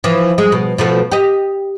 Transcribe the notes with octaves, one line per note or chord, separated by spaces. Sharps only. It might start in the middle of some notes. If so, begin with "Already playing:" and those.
E3 F3
G#3
B2
B2 F3 A3
G4 D#5